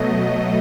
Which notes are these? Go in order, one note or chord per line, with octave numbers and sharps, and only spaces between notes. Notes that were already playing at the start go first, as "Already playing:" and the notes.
Already playing: B2 F#3 A3 D#5